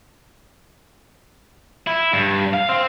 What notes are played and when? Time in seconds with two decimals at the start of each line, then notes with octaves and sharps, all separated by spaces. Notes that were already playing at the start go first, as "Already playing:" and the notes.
1.87 E4
2.13 G2
2.53 F5
2.69 C4